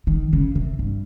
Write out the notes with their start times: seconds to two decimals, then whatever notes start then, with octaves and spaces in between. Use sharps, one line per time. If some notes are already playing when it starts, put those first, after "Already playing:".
0.07 D#3
0.33 C#3
0.55 C3
0.79 G2